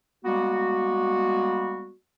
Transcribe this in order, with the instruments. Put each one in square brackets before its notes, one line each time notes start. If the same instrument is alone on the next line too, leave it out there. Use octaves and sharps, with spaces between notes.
[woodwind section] G3 G#3 A#3 B3 F#4